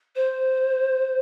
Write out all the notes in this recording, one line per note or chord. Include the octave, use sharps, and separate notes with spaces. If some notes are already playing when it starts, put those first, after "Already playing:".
C5